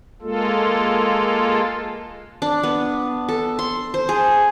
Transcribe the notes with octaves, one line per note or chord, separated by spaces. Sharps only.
G#3 A#3 F4 A4
D4
B3
A4
C6
C5
G#4